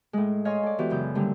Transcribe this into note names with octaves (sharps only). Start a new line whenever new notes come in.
A2 G#3
C#5 D#5 F5 G#5 C6
A4 D5
E3 B3 F#4 G4
F#2 C#3 G6
A#2 D3 G3 A3